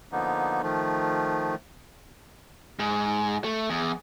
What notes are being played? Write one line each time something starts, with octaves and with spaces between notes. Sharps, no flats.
D3 F3 A#3 B3 D#4
D#3 F3 A3
G#2
A3
E2